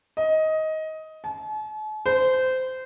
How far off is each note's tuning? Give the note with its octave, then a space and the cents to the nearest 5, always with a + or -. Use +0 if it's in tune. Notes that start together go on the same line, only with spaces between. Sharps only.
D#5 +15
A5 -45
C5 -20